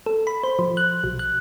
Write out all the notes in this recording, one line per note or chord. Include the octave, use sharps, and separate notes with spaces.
A4
B5
C5
F3
F#6
B1
F#6